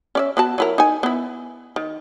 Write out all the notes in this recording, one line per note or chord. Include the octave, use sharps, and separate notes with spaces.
C#4 D5 E5
B3 F#4 A5
F#3 E4 A#4
D#4 G#5
B3 E4
D#3